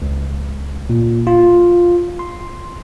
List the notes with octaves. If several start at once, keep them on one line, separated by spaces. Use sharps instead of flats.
C#2
A#2
F4
C6